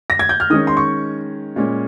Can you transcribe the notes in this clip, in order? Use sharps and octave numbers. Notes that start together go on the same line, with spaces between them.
A#6
G#6
G6
F6
D#3 G#3 C#4 D#6
C6
C#6
A#2 G#3 C#4